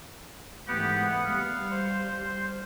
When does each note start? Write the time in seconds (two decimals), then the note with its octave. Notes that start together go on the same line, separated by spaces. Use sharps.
0.68 G#2 E3 A3 B3 G4 F#5
1.24 G3 F5
1.71 C5